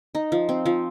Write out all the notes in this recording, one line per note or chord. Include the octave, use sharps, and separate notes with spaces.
D#4
F3
C4
F3